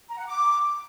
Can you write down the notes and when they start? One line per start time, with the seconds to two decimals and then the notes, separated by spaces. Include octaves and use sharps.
0.10 A#5
0.19 F#5
0.27 D6